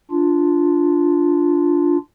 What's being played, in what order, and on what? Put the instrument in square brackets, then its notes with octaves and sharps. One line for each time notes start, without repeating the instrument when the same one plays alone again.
[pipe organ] D4 F4